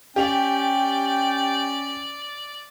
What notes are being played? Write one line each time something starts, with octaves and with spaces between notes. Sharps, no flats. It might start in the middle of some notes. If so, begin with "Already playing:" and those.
C#4 G4 D5 G5 F7